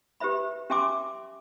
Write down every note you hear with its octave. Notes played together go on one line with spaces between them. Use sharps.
G4 B4 C5 E5 B5
C#4 G4 E5 G#5 C6 D6